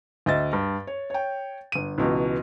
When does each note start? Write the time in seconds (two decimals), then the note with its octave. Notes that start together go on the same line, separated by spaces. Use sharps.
0.26 D2 D#5 E5 A6
0.53 G2
0.87 C#5
1.10 C#5 G5
1.72 G1 D#7
1.98 C#2 B2 E3